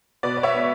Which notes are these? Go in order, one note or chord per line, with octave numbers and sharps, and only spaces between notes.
B2 B4 D5
D5
C#5 E5
B3